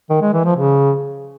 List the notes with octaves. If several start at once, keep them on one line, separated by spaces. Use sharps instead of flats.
D#3
G#3
E3
F3
C#3